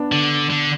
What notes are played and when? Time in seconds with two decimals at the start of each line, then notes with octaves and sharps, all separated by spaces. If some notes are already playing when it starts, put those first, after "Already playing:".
Already playing: B3 D4
0.12 D3
0.50 D3